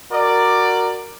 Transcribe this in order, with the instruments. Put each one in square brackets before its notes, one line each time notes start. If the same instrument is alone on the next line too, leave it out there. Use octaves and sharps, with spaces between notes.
[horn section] F#4 A#4 D5